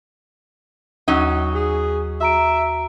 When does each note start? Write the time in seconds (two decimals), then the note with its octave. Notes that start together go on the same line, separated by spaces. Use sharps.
1.08 D#2 F#3 C#4 D#4
1.54 G#4
2.20 F#4 E5 A#5 D7